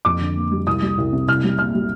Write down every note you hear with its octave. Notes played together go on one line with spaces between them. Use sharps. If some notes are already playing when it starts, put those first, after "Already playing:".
F2 D6
D3
A#3
G3
C2 D#6
G3
C2
C3
C2 F6
G3
A#2 F6
G3